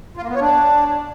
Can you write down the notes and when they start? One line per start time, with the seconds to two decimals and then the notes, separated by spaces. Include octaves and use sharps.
0.17 F4
0.23 A#3
0.29 B3
0.35 C#5
0.41 D4